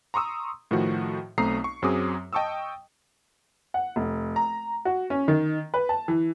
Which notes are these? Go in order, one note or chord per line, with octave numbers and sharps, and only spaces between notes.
A#5 C6 C#6 D#6 E6
A2 D#3 F3 A3 F#4
B1 A3 C4 A#5 D#6 C7
C#6
F#2 F#3 C4 G#4 D6 D#6
D#5 G5 A5 C#6 D#6 E6
F#5
F1
A#5
F#4
C#4
D#3
B4
A5
E3